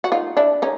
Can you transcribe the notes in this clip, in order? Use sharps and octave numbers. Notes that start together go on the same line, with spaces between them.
F#4
D#4 F4
D4 E4
C#4 D#4